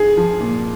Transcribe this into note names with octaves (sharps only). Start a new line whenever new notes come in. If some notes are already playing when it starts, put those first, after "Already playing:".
Already playing: G#4
F3
A#2